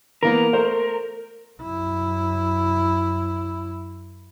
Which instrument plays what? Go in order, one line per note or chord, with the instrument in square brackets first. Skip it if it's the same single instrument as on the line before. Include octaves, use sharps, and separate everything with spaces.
[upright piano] E3 A#3 B3 [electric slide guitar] A#4
[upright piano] A3 C5
[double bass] F#2 E4